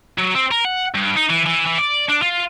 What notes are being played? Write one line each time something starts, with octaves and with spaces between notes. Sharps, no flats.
F#3
C4
A#4
F#5
G2
D#4
E3
E3
E3
D5
D4
F4